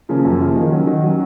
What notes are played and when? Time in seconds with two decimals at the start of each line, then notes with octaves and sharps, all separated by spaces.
0.09 C#3 F3 A#3 C#4
0.25 F#2
0.40 C#3 F3 A#3 C#4
0.55 D#3
0.71 F#3 C#4
0.87 D#3
1.03 F#3 C#4